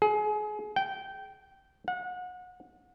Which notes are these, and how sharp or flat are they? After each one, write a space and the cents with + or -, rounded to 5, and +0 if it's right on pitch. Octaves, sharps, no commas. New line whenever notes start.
G#4 +30
G5 -15
F#5 -30